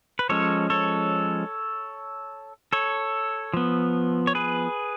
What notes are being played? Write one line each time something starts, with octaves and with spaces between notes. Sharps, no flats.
B4
F3 G#3 C#4 A4 C#5
A4 C#5
A4 C#5
F3 B3
C#5
G#4 B4